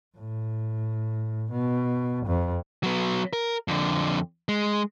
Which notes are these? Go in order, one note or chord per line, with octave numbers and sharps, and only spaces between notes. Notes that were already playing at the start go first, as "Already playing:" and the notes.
A2
B2
F2
F#3 B3
A#4
F2 D3
G#3